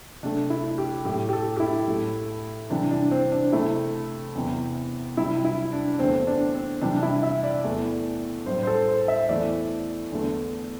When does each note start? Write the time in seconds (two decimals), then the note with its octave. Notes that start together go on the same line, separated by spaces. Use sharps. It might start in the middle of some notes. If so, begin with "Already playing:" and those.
0.23 C3 A3 D4
0.50 E4
0.78 G4
1.05 A2 A3 G4
1.29 G4
1.33 A4
1.56 G4
1.60 E4
1.88 A2 A3
2.70 C3 E3 G3 D4
2.91 D4
3.11 C4
3.32 D4
3.52 C3 A3 E4
4.35 E2 C3 E3
5.17 C3 G3 E4
5.45 E4
5.73 D4
5.94 D4
5.99 E2 D3 A3 C4
6.27 D4
6.55 C4
6.82 C3 E3 G3 D4
6.97 D4
7.03 E4
7.23 E5
7.44 D5
7.64 E2 E3 A3
8.46 A2 G3 C5
8.63 C5
8.67 A4
8.88 C5
9.08 E5
9.29 E2 E3 A3 D5
10.12 E2 D3 A3